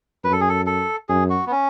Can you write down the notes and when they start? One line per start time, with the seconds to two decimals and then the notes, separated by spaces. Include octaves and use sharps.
0.24 F#2 B4
0.32 A4
0.41 G#4
0.49 A4
0.67 A4
1.09 F#2 G#4
1.30 F#4
1.47 B3
1.51 C#4